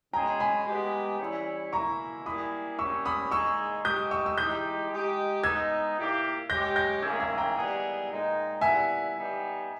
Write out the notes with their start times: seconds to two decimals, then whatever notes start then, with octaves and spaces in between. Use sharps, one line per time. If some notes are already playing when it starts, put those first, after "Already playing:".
0.13 B2 G#3 C#4 G#4 G5 A#5
0.40 G#5 B5
0.66 G#3 B3 G4
1.20 E3 G3 C#4 E4
1.72 B2 A#3 E4 A#5 C#6
2.26 G3 A#3 E4 G#4 B5 D#6
2.79 G3 A#3 C#4 G4 C#6 E6
3.05 B5 D#6
3.31 A#2 G#3 D#4 G#4 C#6 E6
3.84 G#3 D#4 G4 D#6 G6
4.11 C#6 E6
4.26 E6
4.37 E3 G#3 D#4 G4 D#6 G6
4.90 G#3 D#4 G4
5.44 G#3 B3 D#4 E6 G#6
5.97 A#2 A#3 E4 G4
6.50 G#3 C#4 G4 G6 A#6
6.76 G6 A#6
7.02 D#3 A#3 C#4 E4 G#4 E6 G#6
7.20 E6 G#6
7.38 G5 A#5
7.55 D#3 G3 B3 E4 G#4
8.09 A#2 G#3 D#4
8.61 A#2 G3 B3 E4 E5 G#5
9.15 G3 B3 D#4 G4